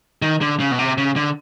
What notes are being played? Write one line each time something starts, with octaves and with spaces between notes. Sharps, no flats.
D#3
D3
C#3
B2
C3
C#3
D3